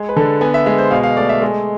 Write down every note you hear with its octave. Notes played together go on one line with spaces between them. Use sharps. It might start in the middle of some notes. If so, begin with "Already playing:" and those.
Already playing: G#3
B4
D3 A4
B3 G#5
E5
G#3 E5
C5
B2 F5
F5
A3 D5
E5
G#3